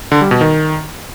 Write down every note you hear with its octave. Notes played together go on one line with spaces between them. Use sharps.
D3
G3
B2
D#3